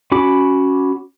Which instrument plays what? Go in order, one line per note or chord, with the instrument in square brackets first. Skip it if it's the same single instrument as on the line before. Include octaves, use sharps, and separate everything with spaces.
[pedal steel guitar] C#4 F#4 B5 D6